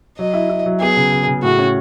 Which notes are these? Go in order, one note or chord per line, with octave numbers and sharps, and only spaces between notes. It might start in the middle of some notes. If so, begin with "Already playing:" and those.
F#3 D#5
E4
E4
F#3
B3 G#4
C#3
C#3
C#3
A2 F#4
C#4